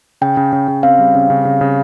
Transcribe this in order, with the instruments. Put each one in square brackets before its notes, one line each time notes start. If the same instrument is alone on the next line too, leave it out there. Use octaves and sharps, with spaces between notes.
[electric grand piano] C#3 [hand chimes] G5
[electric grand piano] C#3
C#3
C#3
[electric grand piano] C4 [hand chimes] F5
[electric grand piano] G3
C#3
C#3
C#3
C#3